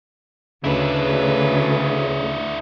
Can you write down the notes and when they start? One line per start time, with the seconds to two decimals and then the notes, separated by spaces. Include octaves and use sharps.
0.64 D2 C#3 D4 E4 B4